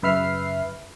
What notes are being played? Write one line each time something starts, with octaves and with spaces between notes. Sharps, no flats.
F#2 C#3 B4 E5 F6 C7